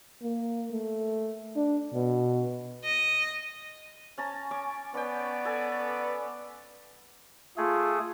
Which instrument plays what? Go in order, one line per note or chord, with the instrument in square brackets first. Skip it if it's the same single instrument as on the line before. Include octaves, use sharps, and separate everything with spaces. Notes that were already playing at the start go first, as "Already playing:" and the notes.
[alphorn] A#3
A3
D4
B2
[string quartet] D#5
[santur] C#4 A5 A#5
C#4 C#6 D6
[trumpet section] B3 D5 [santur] C#4 G5
[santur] A4 G#5
[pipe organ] A3 G#4 [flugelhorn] F4